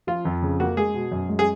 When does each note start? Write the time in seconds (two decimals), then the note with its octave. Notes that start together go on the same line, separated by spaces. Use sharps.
0.07 F3 F4
0.25 F2
0.42 C#3
0.60 A#3 F#4
0.77 G#3 G#4
0.94 B2
1.12 F#2
1.29 G#3
1.39 G#4